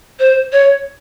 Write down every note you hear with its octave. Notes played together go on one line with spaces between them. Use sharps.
C5
C#5